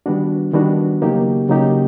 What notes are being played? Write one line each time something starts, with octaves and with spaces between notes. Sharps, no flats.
D#3 G3 B3 D4 F#4
D#3 G3 B3 D4 F#4
C#3 F#3 A#3 D#4 G4
C#3 F#3 A#3 D#4 G4